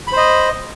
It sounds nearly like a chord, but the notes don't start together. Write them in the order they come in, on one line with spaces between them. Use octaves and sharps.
B5 C5 D#5